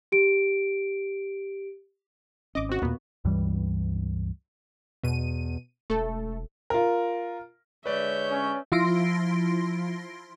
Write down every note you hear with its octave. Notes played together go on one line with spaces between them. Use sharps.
G4 D7
G#1 C#4 D#5 D6
C4 F#4
D#2 A#2 A#3 B3
C#2 G2 E3 G3
E2 B2 D#7
E1 A3 A4
F4 A#4
D3 G#3 B4 C#5 D5 E5 G6
C#4
F3 E4 F4 C6 A#6 D7